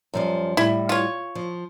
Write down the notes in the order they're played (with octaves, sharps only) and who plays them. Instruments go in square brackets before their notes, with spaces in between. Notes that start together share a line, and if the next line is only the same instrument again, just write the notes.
[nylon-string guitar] F#2 F3 G3
[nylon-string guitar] A2 G3 [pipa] E4
[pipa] F4 C#5
[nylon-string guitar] F3